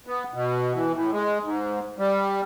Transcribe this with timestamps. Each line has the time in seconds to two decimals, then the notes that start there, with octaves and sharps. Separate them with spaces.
0.07 B3
0.34 B2
0.74 E3
0.93 A2
1.12 G#3
1.43 G#2
1.98 G3